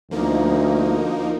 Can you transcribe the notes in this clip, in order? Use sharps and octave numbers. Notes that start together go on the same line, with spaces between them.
D2 F3 A#3 D#4